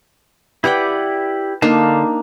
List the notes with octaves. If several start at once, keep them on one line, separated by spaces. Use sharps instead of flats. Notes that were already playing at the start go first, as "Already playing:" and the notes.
E4 G4 B4 D5 F#5 G5
D3 A#3 D4 D#4 F5 A5